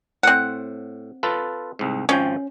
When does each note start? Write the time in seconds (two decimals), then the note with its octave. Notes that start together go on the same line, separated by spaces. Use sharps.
0.23 A2 C4 F#5
1.23 F4 A4 B4
1.79 C2 G#2
2.09 G#1 F3 C#4 G5